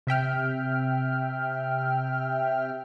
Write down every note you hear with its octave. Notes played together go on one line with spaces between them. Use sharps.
C3 E5 G5 F6